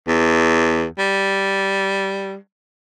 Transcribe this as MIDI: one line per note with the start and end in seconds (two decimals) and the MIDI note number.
0.08 0.85 40
0.98 2.36 55